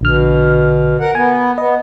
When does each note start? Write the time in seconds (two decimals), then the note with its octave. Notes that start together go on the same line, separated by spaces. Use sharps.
0.01 A#1 B2 D3 F6
1.00 A#4 F#5
1.15 B3 G#5
1.58 B3 D#5